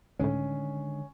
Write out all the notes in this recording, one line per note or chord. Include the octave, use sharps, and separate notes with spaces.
C#2 A2 D3 D#3 G#3 C#4